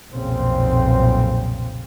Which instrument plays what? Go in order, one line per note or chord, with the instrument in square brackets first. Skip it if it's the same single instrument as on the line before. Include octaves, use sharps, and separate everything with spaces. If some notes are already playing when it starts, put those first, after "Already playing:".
[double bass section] B1 F2 A#2 C#3 C4